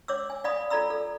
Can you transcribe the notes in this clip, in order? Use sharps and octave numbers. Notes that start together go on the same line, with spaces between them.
C#5 D6 E6
G#5
D5 F5 G#5 B5 D#6
F4 A4 D5 A#5 B5 E6
A4